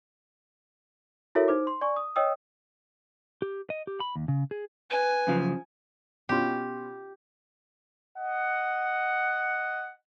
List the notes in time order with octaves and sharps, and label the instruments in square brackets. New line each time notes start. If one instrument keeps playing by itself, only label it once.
[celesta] E4 F#4 A4 A#4 C#5 E5
D#4 C5 D6
C6
D5 G#5 C#6
D#6
C#5 D#5 G5 D#6 E6
[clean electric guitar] G4
D#5
G4
B5
D#2
C#3
G#4
[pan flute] B4 [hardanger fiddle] G#5
[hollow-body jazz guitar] F#2 C#3 F3
[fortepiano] B2 C#4 F4 [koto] G4
[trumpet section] D#5 F#5